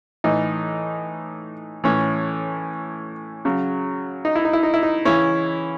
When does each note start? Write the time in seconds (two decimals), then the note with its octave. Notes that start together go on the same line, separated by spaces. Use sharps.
0.24 A2 E3 D#4
1.84 A2 E3 C#4
3.45 C#3 F#3
4.25 D#4
4.36 E4
4.45 D#4
4.53 E4
4.63 D#4
4.74 E4
4.83 D#4
5.05 C#3 E3 C#4 E4